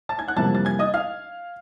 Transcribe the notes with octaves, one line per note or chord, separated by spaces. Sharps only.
A5 A6
G#5 G#6
F#5 F#6
F2 C3 E3 G3 A#3 A5 A6
A6
G#5 G#6
D#5 D#6
F5 F6